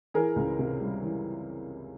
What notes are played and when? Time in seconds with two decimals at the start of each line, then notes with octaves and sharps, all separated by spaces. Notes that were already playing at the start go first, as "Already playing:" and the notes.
0.14 E3 G#4 A#4
0.36 C#2
0.59 C3
0.80 G3
1.02 E3